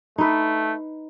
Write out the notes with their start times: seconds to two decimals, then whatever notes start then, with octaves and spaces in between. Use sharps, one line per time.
0.18 A3 D#4 B4